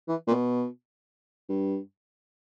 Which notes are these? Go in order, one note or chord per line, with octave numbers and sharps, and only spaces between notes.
E3
A#2
B2
G2